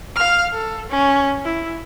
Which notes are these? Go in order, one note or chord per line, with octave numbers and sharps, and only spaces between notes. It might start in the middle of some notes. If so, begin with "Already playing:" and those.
F5 F6
A4
C#4
E4